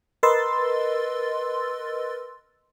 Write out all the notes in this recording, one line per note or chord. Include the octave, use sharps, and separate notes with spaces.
A#4 B4 D#5 C6 E6 A6